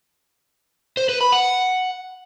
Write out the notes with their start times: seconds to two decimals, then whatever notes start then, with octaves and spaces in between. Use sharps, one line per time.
0.97 C5
1.09 B4
1.21 B5
1.32 F#5